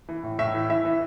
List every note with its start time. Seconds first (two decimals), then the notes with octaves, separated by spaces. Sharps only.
0.08 E3
0.23 A2
0.39 A2 E5
0.54 E3
0.69 E3 E5
0.85 E3